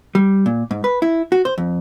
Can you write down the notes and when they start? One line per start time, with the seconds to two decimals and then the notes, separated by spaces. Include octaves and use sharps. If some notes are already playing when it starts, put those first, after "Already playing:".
0.15 G3
0.46 A#2
0.71 G#2
0.84 B4
1.02 E4
1.32 F#4
1.45 C5
1.58 F2